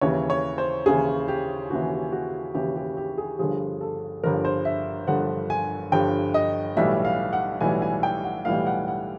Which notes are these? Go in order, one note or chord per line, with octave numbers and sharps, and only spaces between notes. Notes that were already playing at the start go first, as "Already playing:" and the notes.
D#2 C#3 E3 C#5
C#5
C5
D#2 C#3 E3 G#4
G4
D#2 C#3 E3 F#4
F#4
D#2 C#3 E3 G4
G4
G4
G#4
G1 G2 D3 F3 G#4
A4
G1 G2 D3 F3 A#4
C5
E5
G1 G2 D3 F3 F#5
G#5
G1 G2 D3 F3 G5
D#5
B1 A2 E3 G3 E5
F5
F#5
B1 A2 E3 G3 G#5
G#5
G5
F#5
B1 A2 E3 G3 F5
F#5
F#5